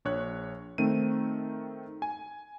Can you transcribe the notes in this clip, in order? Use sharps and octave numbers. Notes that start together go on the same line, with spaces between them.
A#1 C#5 F#6
D#3 A3 C4 D#7
G#5